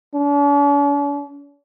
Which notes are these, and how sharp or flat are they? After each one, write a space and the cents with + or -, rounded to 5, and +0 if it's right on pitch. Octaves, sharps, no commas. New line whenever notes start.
D4 -45